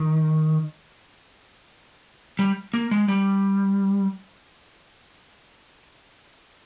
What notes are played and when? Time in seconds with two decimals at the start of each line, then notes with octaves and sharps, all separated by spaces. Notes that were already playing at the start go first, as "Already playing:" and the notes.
Already playing: D#3
2.39 G3
2.74 A#3
2.91 G#3
3.08 G3